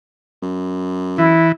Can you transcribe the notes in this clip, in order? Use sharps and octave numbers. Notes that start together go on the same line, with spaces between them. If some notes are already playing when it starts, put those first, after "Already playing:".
F#2
E3 E4